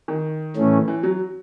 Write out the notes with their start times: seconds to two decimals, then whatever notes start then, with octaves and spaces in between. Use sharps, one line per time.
0.08 D#3
0.56 A2 E3 A3 C#4
0.88 E3
1.03 F#3